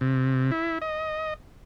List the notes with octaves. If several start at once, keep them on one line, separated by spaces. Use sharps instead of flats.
C3
E4
D#5